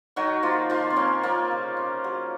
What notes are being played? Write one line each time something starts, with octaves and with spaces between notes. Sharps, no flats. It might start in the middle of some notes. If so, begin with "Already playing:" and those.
D#3 F#3 F#4
F3 A#3 F4
D#3 F3 F4
C4
A#3 C#4
F3 A#3 F4
C#3
C#3
F#3